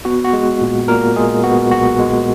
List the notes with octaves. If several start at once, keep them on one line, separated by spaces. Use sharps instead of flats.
B3 F#4
F#4
G#3
A#2
A#2 A#4
G#3 G#4
B3 F#4
B1 F#4
G#3